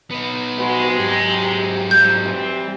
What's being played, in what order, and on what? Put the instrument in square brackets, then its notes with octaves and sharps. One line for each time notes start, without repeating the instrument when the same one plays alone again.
[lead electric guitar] B3 D#4
[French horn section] C3 G#3 [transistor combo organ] F#4 B4
[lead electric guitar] G#2 F#3 [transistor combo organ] G4
[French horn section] F2 [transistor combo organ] G3 [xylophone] G6
[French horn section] E3 C4